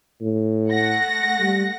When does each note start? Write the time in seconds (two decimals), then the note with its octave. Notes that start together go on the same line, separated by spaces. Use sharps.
0.21 A2
0.70 A3 F#5 A#6
1.40 G3